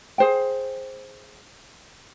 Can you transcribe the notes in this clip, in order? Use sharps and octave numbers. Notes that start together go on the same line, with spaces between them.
G#4 C5 G5